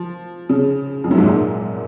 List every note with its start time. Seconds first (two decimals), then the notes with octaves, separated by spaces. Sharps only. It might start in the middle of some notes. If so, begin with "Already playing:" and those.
Already playing: F3
0.49 C#3
1.04 F2
1.11 F#2
1.18 G#2
1.25 A#2